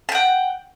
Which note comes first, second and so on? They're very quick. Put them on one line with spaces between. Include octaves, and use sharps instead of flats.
A5 G5 F#5